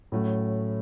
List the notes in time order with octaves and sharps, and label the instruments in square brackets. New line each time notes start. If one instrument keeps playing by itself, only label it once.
[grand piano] A2 F#3 A3 C#4